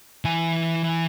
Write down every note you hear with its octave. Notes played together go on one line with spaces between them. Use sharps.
E3 G#5